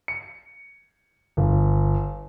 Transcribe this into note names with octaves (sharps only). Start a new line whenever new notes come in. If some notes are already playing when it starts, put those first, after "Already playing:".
C#7
G1